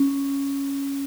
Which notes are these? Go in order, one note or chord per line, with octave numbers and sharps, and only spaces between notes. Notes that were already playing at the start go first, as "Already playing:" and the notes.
Already playing: C#4